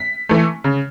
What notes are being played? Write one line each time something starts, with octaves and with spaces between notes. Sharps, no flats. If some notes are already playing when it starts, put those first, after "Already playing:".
Already playing: B6
E3 A3
C#3